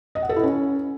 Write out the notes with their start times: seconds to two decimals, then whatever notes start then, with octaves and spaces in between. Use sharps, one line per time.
0.15 D#5
0.22 F#5
0.29 A4
0.36 E4
0.43 C#4